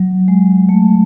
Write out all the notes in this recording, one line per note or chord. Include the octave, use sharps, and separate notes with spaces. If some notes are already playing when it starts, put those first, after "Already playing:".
Already playing: F#3
G#3
A3